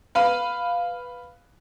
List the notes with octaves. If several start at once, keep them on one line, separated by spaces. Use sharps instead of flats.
B4 F5 B5